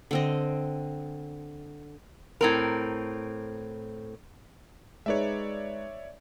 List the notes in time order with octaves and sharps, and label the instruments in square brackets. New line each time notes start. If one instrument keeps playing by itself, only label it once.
[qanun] D3 C4 D#5
[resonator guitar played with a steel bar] A2 C4 A#4
[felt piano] G#3 D#4 B4 [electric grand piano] C#5 D5 E5